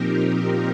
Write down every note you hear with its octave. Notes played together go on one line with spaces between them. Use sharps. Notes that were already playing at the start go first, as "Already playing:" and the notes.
Already playing: A#2 F3 C4 D#4 G4 A#4